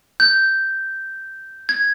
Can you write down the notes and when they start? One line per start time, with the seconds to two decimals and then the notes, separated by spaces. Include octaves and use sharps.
0.20 G6
1.69 G#6